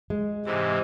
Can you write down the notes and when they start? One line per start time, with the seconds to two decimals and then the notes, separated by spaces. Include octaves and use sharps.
0.10 G#3
0.45 G#2 C3 E3 G4 C5 D#5